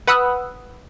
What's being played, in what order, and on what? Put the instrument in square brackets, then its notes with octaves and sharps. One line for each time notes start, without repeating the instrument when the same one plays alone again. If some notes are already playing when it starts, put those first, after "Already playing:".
[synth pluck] B4 F#5 B5 D#6 E6 F#6